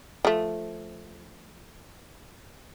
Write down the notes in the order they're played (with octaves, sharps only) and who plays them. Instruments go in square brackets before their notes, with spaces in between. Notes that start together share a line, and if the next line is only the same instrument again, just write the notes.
[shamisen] F3 A3